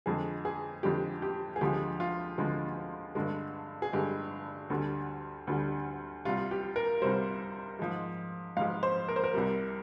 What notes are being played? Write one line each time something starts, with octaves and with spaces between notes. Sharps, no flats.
F2 D3 G#3 G#4
G#4
F2 D3 G#3 G4
G4
G#4
D2 D3 F3 G#3 G4
F4
D2 D3 F3 G#3
G2 D3 G#3
G#4
G2 D3 G#3 G4
D2 D3 G3
D2 D3 G3
C2 C3 G3 F4
G4
A#4
C2 C3 G3 C5
G#2 F3 G#3
G#2 F3 G#3 F5
C5
A#4
C5
A#4
C2 C3 G3